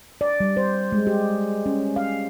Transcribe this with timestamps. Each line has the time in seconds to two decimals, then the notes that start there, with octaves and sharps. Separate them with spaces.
0.21 D5
0.40 G3
0.57 C5
0.92 G#3
1.07 G4
1.66 C#4
1.96 F5